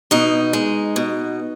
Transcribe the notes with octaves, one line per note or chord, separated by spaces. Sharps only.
B2 D#4
G#3
B2